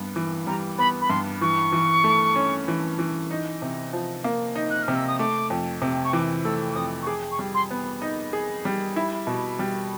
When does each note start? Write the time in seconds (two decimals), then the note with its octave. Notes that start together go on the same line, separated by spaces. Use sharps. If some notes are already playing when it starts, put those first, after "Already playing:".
Already playing: G2 B3
0.16 E3
0.47 G3 A#5
0.78 B3 B5
1.01 B5
1.10 G2 C6
1.41 E3 C#6
1.72 E3
2.04 A3
2.36 C#4
2.68 E3
2.99 E3
3.31 D#4
3.62 C3
3.93 F3
4.24 A#3
4.55 D#4
4.70 F#6
4.83 F6
4.88 C3
4.95 E6
5.07 D#6
5.19 A3 D6
5.50 F2
5.82 C3
6.04 C#6
6.13 E3 D6
6.44 A3 E6
6.71 D6
6.76 F2 D#6
7.02 C#6
7.07 G#4 D6
7.31 C#6
7.39 G3
7.54 C6
7.71 B3
8.02 D#4
8.33 G#4
8.65 G3
8.96 E4
9.27 B2
9.59 G3